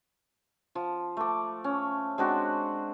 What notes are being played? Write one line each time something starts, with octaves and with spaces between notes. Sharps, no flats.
F3
A3 D6
C#4
G#3 C4 D4 F#4